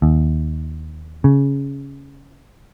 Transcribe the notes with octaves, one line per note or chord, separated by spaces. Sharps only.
D#2
C#3